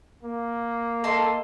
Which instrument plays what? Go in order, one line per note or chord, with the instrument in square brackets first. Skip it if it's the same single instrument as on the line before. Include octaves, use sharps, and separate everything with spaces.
[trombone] A#3
[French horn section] A4 [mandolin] D#5 A5 C6